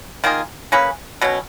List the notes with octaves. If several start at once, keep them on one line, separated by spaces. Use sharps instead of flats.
D#3 A#3 F4 G#4
A#3 C#4 G#4 B4
B2 F#3 C#4